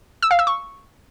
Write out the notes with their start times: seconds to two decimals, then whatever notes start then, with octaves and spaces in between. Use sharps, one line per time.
0.23 E6
0.31 F5
0.39 E6
0.47 C#6